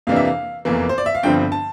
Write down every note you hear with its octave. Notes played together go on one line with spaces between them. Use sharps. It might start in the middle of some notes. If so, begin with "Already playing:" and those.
F2 C3 E3 A#3 D4 F5
E5
F5
F1 E2 E3 A#3
C5
D5
E5
F5
G1 G2 D3 F3 C4 G5
A5